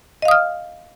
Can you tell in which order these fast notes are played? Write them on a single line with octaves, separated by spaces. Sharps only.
D#5 F5 D#6 F6